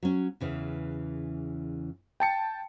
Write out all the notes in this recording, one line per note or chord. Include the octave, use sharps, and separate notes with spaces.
F#3 C#4
E2 C#3 E3
G5 A5 C#7